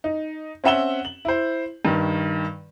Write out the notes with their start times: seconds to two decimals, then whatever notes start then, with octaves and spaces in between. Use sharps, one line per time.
0.04 D#4
0.64 C4 C#4 E5 F#5 E7 G7
1.05 F#7
1.25 E4 C5
1.85 G2 D#3